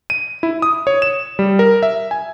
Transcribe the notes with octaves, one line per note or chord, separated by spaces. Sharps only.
D#7
E4
D#6
C#5
E7
G3
A#4
E5
G#5